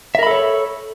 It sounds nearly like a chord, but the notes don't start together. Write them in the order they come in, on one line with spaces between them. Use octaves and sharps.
E5 A#4 B5 A4 C#5